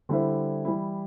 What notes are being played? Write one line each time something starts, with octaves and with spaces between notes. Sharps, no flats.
D3 G3 E4 C5 E5
E3 G3 E4